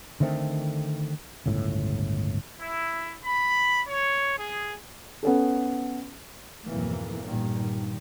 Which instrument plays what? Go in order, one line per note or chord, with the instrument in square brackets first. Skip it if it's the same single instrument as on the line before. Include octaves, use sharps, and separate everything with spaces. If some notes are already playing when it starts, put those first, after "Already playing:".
[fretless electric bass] D3 D#3 A3 C4
G1 C#2 A2
[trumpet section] E4
B5
C#5
G#4
[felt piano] B3 C#4 A4
[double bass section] B1 F2 G#2 E3 A#3
G2 A#2 D#3